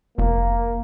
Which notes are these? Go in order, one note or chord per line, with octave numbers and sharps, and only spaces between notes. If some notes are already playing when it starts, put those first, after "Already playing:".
F1 A#3